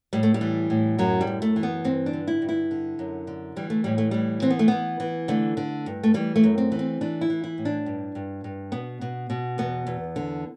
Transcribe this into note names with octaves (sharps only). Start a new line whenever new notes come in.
A2 G3
A3
G3
E3
A2
F#2 F#3
G3
F#2
A3
E3
B3
G2 C4
D4
D3
E4
G2
E4
D3
F#2
D3
E3 G3
A3
A2 G3
A3
E3 G3
E3 C4
B3
A3
E3 B3
E3
D3 A3
D3
G2
A3
E3 G3
A3
F#2
C4
E3
C4
E3 D4
E4
E3
E4
A2
D4
G2
G2
G2
B2 B3
B2
B2
E2 B3
E2
D3